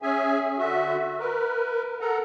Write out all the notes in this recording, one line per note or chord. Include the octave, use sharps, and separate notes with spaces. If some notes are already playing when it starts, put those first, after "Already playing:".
C#4 G#4 E5 G#5
D3 F#4 E5
A#4 B4
A4 A#4 F#5 A#5